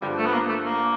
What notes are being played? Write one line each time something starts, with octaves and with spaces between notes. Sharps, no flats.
G2 D3 F3 G3
A3
B3
A#3
A3
A#3